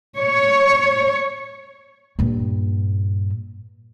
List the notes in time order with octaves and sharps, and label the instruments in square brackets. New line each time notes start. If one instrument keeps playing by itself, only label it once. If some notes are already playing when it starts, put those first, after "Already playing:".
[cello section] C#5
[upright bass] G2 A#2